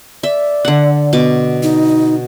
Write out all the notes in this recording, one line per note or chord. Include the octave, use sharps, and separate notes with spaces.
D5 E5
D3 F#5
B2 D6
D#4